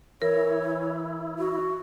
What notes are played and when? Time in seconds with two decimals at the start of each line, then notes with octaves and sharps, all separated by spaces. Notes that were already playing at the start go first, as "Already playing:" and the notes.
0.22 E3 E4 A#4 C#5
1.39 F#4